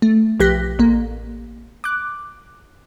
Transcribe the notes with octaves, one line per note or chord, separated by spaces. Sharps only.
A3
B1 F3 G4 F#6 A#6 B6
A1 A#3
D6 F#6